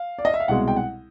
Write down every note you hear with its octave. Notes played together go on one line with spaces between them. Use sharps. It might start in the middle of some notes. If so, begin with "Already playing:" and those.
Already playing: F5
D5
D#5
E5
F5
C2 B2 G#3 F#5
G5
F#5